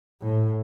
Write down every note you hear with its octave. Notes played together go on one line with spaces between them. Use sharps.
A2